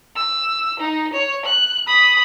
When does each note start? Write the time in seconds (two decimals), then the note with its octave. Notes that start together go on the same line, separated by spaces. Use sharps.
0.16 E6
0.80 D#4
1.13 C#5
1.45 F#6
1.87 B5 D#6